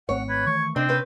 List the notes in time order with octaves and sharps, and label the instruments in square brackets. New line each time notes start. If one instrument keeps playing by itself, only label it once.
[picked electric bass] G#1 A3 C4 [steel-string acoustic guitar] C#5 [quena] F#5
[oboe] B4 [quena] G#6
[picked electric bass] D#3 E3 A3 [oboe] C#6
[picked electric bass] C3 [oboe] C4 [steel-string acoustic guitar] D4 [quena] D#5
[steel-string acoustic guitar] C#4 B4 [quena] G6